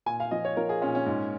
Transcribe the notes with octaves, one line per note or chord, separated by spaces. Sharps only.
A#2 G#5
F5
F3 D#5
C#5
F3 A#4
G#4
A#2 C#4
C#4
G#2